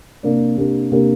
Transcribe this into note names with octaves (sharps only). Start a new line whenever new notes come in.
C3 A#3 D4 A#4 D5
C3 A#3 D4 G4 A#4
C3 A#3 D4 G4 A#4